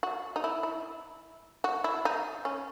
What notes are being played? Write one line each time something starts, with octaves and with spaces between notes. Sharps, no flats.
F#4
D#4
E4
E4
F#4
E4
D#4
C#4